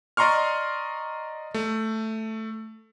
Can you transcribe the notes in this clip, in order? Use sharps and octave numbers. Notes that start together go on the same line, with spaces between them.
D5 D#5 A#5 C6 C#6 F6
A3